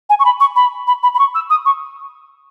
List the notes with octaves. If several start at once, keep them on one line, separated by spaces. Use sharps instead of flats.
G#5
C#6
B5
C#6
B5
B5
B5
B5
C#6
E6
D#6
C#6